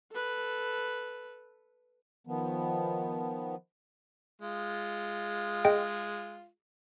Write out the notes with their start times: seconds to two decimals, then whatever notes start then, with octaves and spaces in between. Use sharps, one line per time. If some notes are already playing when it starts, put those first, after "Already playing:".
0.10 A4 B4
2.27 D#3 F3 B3
4.41 G#3 F4
5.65 G#4 D#5 G5